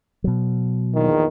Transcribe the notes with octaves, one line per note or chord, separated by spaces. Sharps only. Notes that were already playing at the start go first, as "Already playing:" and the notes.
B2 F#3
A#1 E2 D#3